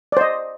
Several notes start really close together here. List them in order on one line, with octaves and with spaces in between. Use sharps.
D5 C5 D#5